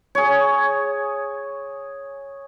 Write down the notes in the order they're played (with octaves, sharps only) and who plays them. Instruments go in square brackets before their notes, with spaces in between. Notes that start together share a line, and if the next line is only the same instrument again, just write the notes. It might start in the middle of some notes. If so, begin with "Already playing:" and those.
[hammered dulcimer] G#4 C#5